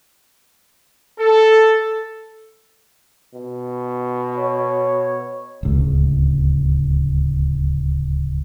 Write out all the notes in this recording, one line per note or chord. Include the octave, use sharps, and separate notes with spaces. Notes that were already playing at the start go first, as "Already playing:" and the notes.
A4
B2
C#5
D1 C#2